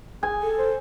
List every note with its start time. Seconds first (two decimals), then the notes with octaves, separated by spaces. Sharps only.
0.23 G#4 G#5
0.42 A4
0.58 C5